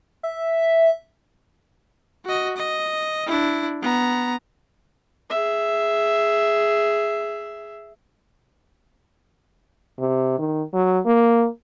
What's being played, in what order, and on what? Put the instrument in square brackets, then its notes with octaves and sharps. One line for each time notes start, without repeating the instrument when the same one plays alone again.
[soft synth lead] E5
[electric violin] F#4 D#5
D#5
D4 E4
B3 A#5
[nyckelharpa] G#4 E5
[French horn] C3
D#3
F#3
A#3